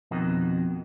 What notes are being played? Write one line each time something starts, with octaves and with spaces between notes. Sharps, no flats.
F2 B2 D#3